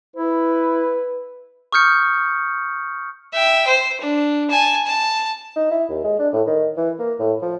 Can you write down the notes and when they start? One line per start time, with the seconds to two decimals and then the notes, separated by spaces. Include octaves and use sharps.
0.16 E4 B4
1.72 C#6 D#6 F6 G6 C#7
3.33 E5 G5
3.67 C5
4.01 D4
4.50 G#5 A5
4.86 A5
5.56 D#4
5.71 E4
5.89 D#2
6.04 G#3
6.19 D4
6.33 A2
6.47 D#3
6.77 E3
6.99 A#3
7.19 A2
7.42 F3